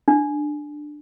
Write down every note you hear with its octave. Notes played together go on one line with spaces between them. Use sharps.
D4